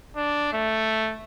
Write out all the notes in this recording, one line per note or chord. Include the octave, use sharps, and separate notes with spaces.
D4
A3